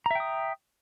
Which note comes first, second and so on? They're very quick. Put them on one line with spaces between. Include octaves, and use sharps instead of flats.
A#5 E5 G5 D#6